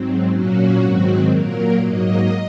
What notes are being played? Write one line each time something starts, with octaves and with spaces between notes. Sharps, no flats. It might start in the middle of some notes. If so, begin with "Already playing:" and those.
Already playing: G#2 F#3 C4
A#2 F#3 A#3 C#4 F#4
G#2 D#3 F#3 C4
A#2 F#3 A#3 A#4
G#2 F#3 A#3 D#5